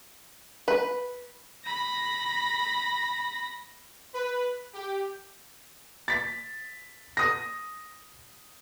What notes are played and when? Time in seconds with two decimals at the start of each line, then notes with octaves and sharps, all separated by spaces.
0.68 B4
1.65 B5 A#6
4.14 B4
4.74 G4
6.08 A6 B6
7.17 D#6 A#6